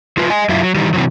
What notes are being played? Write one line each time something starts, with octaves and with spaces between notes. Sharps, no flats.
F#3 F4 B4
D#5 G#5
F#2 F#3 E4 F4
F#3
D#3 E3 G3
C3 E3 F#3